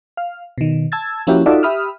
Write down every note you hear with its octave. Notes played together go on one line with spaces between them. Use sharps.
F5
B2 D#3
A5 E6 G#6 A6
F3 A#3 C#4 E4 F#4 G4
D#4 F4 F#4 A4 D5 E5
G4 E5 B5 D#6 F6